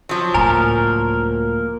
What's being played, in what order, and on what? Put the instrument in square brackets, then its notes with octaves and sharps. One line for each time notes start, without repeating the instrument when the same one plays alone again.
[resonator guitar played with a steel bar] F3 F#3
[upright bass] C#2 A2 [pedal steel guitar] A#3 A#4 [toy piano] G#5 A#5